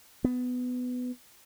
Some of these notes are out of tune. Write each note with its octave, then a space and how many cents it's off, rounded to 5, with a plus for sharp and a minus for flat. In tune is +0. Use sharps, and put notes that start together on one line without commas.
B3 +15